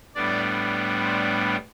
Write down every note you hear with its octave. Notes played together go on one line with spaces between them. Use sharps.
A2 G3 B3 D4 D5
C5